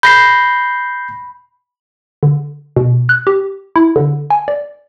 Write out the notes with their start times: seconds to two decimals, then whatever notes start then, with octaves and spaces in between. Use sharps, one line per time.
0.03 B5 G6 A#6 C7
2.23 D3
2.76 B2
3.09 F#6
3.27 G4
3.76 E4
3.96 D3
4.30 G#5
4.48 D5